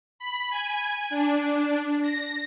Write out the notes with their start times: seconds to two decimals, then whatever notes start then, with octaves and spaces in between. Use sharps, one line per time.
0.19 B5
0.50 G#5
1.10 D4
2.02 A#6